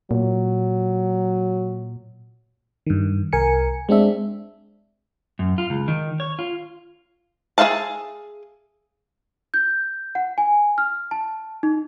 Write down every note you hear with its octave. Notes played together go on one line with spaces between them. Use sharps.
A#2 F#3
G2 D#3
C2 A#4 G#5 C#7
G#3 C4 D4 E5
F#2
F4
C#2
D#3
C#5
F4
G#4 B4 E5 F5 A5
G6
F#5
G#5
F6
A5
D#4